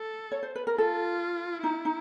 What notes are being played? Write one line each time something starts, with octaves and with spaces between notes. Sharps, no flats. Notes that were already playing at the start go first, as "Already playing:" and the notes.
Already playing: A4
C#5
C5
B4
A#4
F4 A4
D#4 E4
D#4